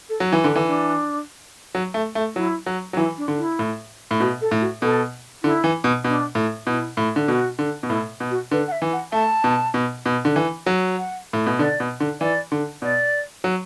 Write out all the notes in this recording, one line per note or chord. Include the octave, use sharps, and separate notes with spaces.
A4
F#3
E3 E4
D3
D4
E3
D4
F#3
A3
A3
F#3 E4
F#3
F#3
E3 E4
D4
D3
E4
A2
A2
B2 F#4
A4
A2
F#4
B2 A4
D3 E4
E3
B2
B2 D4
A2
B2 E4
A2
D3
B2 F#4
D3
B2
A2 E4
B2
F#4
D3 B4
F#5
E5
E3
F#5
A3 A5
B2
B2
B2
D3
E3
F#3
F#5
A2
B2
D3 D5
B2
D3
E3 D5
D3
B2 D5
F#3